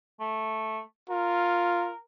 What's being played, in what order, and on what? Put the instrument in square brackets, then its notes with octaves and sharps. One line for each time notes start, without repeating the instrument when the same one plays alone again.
[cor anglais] A3
[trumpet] F4 [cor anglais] A#4